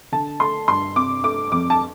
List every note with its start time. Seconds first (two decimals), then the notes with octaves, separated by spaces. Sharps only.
0.12 D3 A5
0.40 A3 C6
0.68 G2 C6
0.96 C3 D6
1.24 A3 D6
1.52 F2 D6
1.70 A5